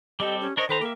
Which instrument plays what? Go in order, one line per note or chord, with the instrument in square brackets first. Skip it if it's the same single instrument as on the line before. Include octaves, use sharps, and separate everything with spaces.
[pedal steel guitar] G3 C4 A4 [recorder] G4 [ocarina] D#5
[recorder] C#4 [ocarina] G4
[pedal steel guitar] D4 A#4 C#5 [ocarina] C5 [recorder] D#5
[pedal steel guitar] D#3 B4 A#5 [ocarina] A4 [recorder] C5
[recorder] A#3 [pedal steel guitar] G4 E5